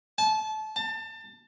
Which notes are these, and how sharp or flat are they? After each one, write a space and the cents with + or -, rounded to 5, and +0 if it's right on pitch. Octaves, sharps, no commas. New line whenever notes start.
A5 -25
A5 +30